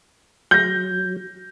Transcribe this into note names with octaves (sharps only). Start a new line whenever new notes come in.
F#3 G6 A#6